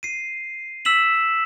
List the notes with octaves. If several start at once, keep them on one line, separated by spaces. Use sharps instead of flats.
C7 D#7
E6 B6 E7 F#7